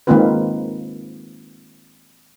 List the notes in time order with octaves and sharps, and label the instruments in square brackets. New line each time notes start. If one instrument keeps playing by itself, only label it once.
[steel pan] D#3 G#3 A#3 C4 F4 B4